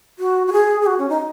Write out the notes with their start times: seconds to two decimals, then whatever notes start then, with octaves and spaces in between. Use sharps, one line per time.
0.19 F#4
0.47 F#4
0.53 G#4
0.82 G#4
0.87 F#4
0.99 C#4
1.09 D#4